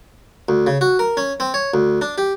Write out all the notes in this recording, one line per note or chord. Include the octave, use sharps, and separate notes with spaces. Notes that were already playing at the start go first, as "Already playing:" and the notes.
D2
C#3
F#4
A#4
C#4
C4
C#5
D2
D4
G4